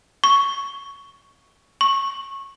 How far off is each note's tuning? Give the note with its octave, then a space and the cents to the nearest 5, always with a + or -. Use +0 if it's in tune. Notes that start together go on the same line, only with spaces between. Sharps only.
C#6 +5
C#6 -15